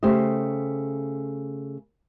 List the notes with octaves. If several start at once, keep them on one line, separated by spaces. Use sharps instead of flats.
C#3 A3 G4 C5 D#5